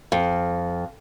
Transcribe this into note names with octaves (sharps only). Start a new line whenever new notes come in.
F2